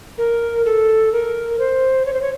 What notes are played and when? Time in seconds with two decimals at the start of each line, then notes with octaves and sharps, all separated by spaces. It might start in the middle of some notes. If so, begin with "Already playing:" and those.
0.18 A#4
0.65 A4
1.12 A#4
1.59 C5
2.06 C#5
2.13 C5
2.22 C#5